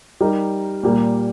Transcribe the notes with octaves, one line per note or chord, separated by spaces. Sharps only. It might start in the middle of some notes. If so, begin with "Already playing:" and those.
G3 D#4 G4 A#4
A#2 G3 A#3